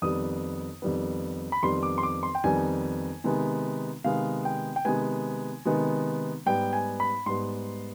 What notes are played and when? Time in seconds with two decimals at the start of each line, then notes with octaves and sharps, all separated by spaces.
0.02 F2 D#3 G3 B3 D#6
0.82 F2 D#3 G3 B3
1.52 B5
1.63 F2 D#3 G3 B3 C6
1.83 D6
1.98 C6
2.03 D6
2.23 C6
2.35 G5
2.44 F2 D#3 G3 B3 G#5
3.24 C3 D#3 G#3 B3
4.04 C3 D#3 G#3 B3 F5
4.45 G5
4.76 G5
4.85 C3 D#3 G#3 B3 G#5
5.65 C3 D#3 G#3 B3
6.46 G#2 G3 B3 G5
6.73 G#5
7.00 B5
7.26 G#2 G3 B3 C6